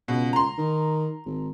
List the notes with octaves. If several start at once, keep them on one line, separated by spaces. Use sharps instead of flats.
C#2 B2
A#5 C6
D#3
G#1